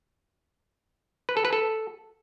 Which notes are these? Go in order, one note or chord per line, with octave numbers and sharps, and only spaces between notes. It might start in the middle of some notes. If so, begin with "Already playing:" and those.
B4
A4
B4
A4